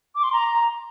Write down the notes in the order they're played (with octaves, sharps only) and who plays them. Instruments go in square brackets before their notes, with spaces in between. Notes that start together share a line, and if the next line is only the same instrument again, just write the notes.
[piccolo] D6
C6
A#5